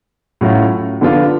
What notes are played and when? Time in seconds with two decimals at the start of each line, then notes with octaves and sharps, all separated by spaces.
0.41 A2 F#3 C#4 F4
1.01 D3 F3 B3 D4 F4